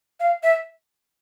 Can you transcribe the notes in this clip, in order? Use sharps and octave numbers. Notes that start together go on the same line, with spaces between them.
F5
E5